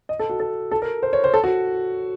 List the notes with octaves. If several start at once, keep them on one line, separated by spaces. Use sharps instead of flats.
D#5
A4
F#4
A4
A4
A#4
C5
C#5
C5
A4
F#4